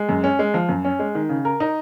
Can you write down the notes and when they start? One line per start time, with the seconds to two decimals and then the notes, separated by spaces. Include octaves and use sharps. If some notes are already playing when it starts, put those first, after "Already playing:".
Already playing: G#3
0.09 F#2
0.24 C#4
0.39 G#3
0.54 F3
0.69 F#2
0.85 C#4
0.99 G#3
1.15 D#3
1.29 C#3
1.45 A#4
1.60 D#4